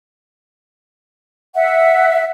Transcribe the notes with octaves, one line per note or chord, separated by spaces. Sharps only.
E5 F#5